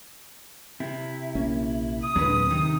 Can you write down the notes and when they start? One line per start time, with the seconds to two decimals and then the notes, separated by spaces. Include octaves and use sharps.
0.80 C3 E4
1.35 A#1 A#3 C#4
2.03 D#6
2.16 D#2 A#2 D3 F#3 G#3 C4 D4 B4
2.51 C3 D#3 D#4